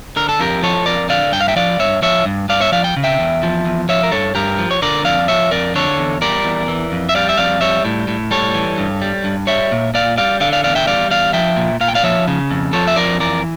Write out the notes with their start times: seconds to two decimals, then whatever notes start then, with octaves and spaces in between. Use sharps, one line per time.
0.16 D3 A#4
0.29 A4
0.39 F2 G4 A#4
0.63 F3 A4 C#5
0.86 F2 A#4 D5
1.09 D3 D5 F5
1.32 G2 G5
1.40 F5
1.48 E5 G5
1.56 F3 D5 F5
1.79 G2 C#5 E5
2.02 F3 C#5 E5
2.25 G2
2.49 G2 D5 F5
2.60 C#5 E5
2.72 F3 D5 F5
2.84 G5
2.96 C#3
3.04 E5 G5
3.20 E2
3.43 F3
3.65 E2
3.89 F3 C#5 E5
4.03 A#4
4.12 G2 A4 C#5
4.35 G2 G4 A#4
4.59 F3
4.71 C#5
4.82 D3 A#4 D5
5.05 F2 D5 F5
5.28 F3 C#5 E5
5.51 F2 A#4 D5
5.76 D3 A4 C#5
5.98 E2
6.22 G3 A#4 D5
6.44 E2
6.68 E3
6.92 F2
7.09 E5
7.15 G3 D5 F5
7.29 E5
7.38 F2 D5 F5
7.61 G3 C#5 E5
7.85 A2
8.08 A2
8.31 G3 A4 C#5
8.54 E3
8.78 G2
9.02 G3
9.24 G2
9.47 G3 C#5 E5
9.72 A#2
9.94 A#2 D5 F5
10.18 G3 D5 F5
10.40 D3 D5 F5
10.53 D5 F5
10.64 E2 D5 F5
10.75 E5 G5
10.87 G3 D5 F5
11.11 E2 D5 F5
11.33 F3 E5 G5
11.57 A#2
11.81 A#2 F5
11.88 G5
11.95 D5 F5
12.03 F3 C#5 E5
12.28 C#3
12.51 F2
12.73 F3 A4 C#5
12.87 E5
12.96 F2 A#4 D5
13.20 E3 A#4 D5